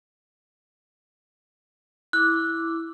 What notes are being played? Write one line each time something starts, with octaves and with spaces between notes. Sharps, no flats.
E4 D6 F#6